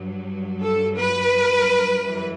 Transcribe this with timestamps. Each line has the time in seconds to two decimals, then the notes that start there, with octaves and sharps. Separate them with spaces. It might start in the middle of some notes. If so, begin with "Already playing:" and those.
Already playing: G2 F#3
0.61 A4
0.96 B4
2.03 F#2 E3 G3